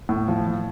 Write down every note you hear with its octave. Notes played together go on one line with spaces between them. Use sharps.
A2
F3
F3